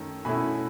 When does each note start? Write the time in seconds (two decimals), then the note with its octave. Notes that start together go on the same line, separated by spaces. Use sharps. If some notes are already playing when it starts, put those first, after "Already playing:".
Already playing: F#2 D#3 A3
0.25 B2 A3 C#4 E4 G#5 B5